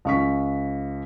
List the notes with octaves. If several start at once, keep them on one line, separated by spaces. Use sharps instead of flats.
C#2 C#6 B6